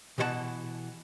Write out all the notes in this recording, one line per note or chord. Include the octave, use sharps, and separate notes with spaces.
B2 E3 A#4 C5 F#5 A5